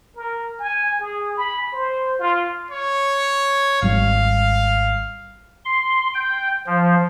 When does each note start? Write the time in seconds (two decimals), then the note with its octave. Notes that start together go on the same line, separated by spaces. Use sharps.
0.15 A#4
0.59 G#5
1.00 G#4
1.37 B5
1.73 C5
2.19 F4
2.71 C#5
3.82 G#1 G3 F5
5.65 C6
6.14 G5
6.67 F3